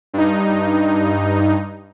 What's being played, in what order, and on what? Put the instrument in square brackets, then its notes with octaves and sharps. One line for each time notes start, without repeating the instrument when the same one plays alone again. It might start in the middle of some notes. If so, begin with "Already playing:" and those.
[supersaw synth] G2 D#4